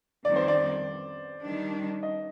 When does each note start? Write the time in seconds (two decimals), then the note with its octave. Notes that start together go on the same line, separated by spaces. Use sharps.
0.24 F2 D#3 G3 C4 D5
0.36 C5
0.48 D5
1.43 D#3 G3 D4
2.03 D#5